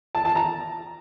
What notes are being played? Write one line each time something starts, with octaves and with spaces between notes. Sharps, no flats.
A5
A5
A#5